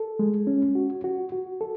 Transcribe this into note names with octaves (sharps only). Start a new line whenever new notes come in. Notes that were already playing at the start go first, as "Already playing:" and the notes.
Already playing: A4
G#3
C#4
F#4
F#4
F#4
A4